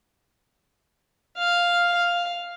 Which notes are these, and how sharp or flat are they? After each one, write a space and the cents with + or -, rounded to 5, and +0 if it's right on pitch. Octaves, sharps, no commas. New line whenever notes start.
F5 +0
F5 +5